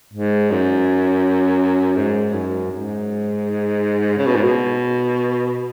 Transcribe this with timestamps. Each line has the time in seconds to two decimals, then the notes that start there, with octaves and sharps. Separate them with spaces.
0.13 G#2
0.51 F#2
1.96 G#2
2.33 F#2
2.71 G#2
4.18 C#3
4.26 B2
4.36 G#2
4.44 B2